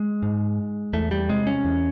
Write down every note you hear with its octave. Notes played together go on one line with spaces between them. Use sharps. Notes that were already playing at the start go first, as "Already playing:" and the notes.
Already playing: G#3
G#2
E2 A3
G3
C3 G#3
C#4
E2